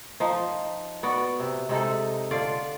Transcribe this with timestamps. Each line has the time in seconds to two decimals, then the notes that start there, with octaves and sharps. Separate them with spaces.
0.20 F3 D#4
1.03 B3 F#4 D5
1.40 C3
1.69 C3 G#3 D#4 A4
2.31 D3 F4 D5